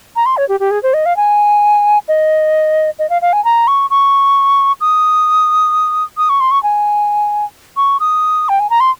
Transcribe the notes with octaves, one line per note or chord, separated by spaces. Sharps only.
A#5
C6
C#5
G4
G4
G#4
C5
D#5
F5
G#5
D#5
D#5
F5
F5
G#5
A#5
C#6
C#6
D#6
D#6
C#6
C6
C#6
G#5
C#6
D#6
G5
G#5
A#5
C6